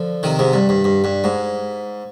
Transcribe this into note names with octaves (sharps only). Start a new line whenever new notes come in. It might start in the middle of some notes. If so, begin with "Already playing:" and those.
Already playing: D3 F3
C3 D#3
G#2 C3
G2
G2
G2
G2
G#2